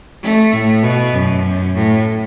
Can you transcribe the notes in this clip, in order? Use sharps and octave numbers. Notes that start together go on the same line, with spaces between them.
A3
A2
B2
F#2
A2